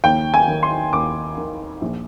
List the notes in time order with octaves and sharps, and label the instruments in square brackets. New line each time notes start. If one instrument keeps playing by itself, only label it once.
[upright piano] D#2 G5
G#5
D#3
C6
D#2 D6
D#3
A#1